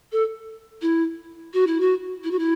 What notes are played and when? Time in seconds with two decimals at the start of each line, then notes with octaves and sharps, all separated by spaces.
0.12 A4
0.81 E4
1.53 F#4
1.66 E4
1.80 F#4
2.23 E4
2.31 F#4
2.38 E4